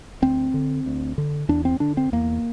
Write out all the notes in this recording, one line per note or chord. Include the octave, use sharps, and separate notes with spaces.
D2 C4
D3
D2
D3
E2 D4
C4
D3 D4
C4
E2 A#3